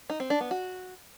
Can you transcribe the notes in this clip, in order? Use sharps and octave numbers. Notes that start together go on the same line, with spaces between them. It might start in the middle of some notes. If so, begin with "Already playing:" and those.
D#4
C4
D4
B3
F#4